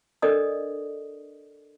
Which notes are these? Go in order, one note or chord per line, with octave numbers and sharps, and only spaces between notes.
D4 A4 A#4 D5 D#5 D#6